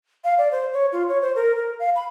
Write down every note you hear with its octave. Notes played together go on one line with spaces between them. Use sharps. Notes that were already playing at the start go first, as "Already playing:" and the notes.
F5
D5
C5
C#5
F4
C#5
C5
A#4
A#4
F5
B5